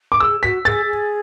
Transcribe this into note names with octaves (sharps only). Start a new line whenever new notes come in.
D6
G#4 E6
F#4 B6
G#4 A6
G#4